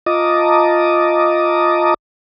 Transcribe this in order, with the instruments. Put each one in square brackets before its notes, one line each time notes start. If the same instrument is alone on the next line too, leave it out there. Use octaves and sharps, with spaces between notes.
[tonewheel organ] F4 D#5 A5 A#5 D6 D#6